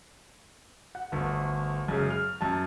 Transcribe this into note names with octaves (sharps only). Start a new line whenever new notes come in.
F#5
G1 D2
F#2 C#3 G#3
F6
F#2 A5